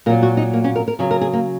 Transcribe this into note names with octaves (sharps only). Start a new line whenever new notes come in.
A#2 F#3 A#4
F#4
D#4
A#3
C#4
A#4
A#4
C#3 F#3 C#5
A#4
G#4
A#3